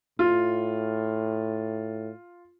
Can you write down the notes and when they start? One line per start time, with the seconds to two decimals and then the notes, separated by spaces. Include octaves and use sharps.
0.19 A2 F4